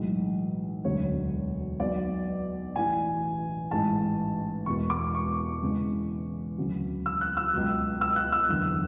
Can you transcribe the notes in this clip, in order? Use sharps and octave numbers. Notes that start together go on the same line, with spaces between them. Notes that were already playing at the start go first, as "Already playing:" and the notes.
Already playing: B1 A2 E3 G#3
E1 D2 D3 F#3 C#5
B1 B2 F#3 D5
A1 A2 E3 G#5
A1 G#2 E3 G#3 A5
E1 E2 B2 G#3 C#6
D6
C#6
E2 C#3 E3 G#3
D2 C#3 F#3
E6
F#6
E6
C#2 B2 F#3
E6
F#6
E6
F#1 E2 D3